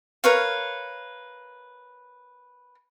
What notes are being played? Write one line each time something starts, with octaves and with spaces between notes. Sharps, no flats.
A#4 B4 C#5 F5